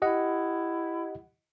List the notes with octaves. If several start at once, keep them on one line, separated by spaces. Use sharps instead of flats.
E4 G4 D#5 F#5